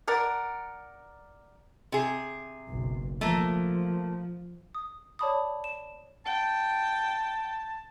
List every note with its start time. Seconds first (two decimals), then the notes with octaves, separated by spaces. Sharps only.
0.08 A#4 D5 F#5
1.92 C3 G#4
2.68 F#1 B1
3.21 F3 A3 A#3
4.75 D#6
5.19 C#5 D5 A5 B5 D6 D#6
5.64 E7
6.25 G5 A5